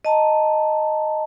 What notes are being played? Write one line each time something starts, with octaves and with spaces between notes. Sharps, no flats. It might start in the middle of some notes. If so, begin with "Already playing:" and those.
D#5 A5 A#5